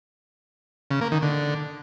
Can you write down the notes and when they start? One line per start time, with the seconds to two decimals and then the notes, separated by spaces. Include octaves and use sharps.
0.91 C#3
1.01 A#3
1.12 D#3
1.22 D3